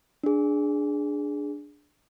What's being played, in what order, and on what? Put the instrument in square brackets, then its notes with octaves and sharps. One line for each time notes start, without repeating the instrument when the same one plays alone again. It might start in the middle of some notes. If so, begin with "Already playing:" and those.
[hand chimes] D4 G#4